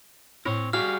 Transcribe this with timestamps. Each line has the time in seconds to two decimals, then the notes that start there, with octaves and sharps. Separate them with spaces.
0.45 A2 C4 C#5
0.73 G3 F#4 G#4 F5 F6